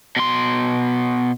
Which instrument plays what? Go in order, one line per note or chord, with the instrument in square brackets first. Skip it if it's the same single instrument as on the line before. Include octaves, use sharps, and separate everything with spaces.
[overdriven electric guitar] B2 C6